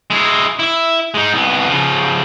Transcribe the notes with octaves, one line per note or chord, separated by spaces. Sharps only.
G#3 E4
E4 E5
G#3 D#4
C2 B3
C#3 F3